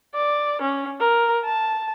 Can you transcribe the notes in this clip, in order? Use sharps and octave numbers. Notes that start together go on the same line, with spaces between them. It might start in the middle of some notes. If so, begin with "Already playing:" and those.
D5
C#4
A#4
A5